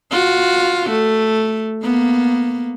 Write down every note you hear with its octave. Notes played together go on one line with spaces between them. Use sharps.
F4 F#4
A3
A#3 B3